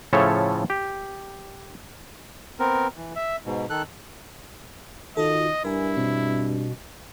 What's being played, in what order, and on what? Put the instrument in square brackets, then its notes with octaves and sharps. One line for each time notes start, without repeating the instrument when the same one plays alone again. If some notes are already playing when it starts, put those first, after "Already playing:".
[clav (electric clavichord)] A2 C#3 F3 A4 C#5 E5
G4
[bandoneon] B3 C4 A#4
E3
E5
G#2 B2
D#3 A4 F#6
[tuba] D#3 [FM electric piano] F4 F#4 A4 [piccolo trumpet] D#5
[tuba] G2 [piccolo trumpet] E4 [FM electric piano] A#4 G#5
[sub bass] B2 [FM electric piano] C4